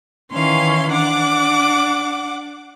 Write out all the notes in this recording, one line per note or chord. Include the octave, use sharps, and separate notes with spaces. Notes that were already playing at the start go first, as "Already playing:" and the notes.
D#3 E3 C#4 F5 C6
D4 F#5 D6